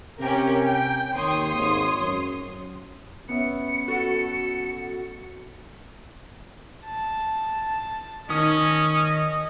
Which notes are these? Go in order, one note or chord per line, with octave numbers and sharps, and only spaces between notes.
C3 C#4 G4 A#4
G5
D#2 C#5 C6 D#6
G#1
F#2
B3 C#4 E5 C#7
F#4 A4
A5
D#3 C#4 D#5 D#6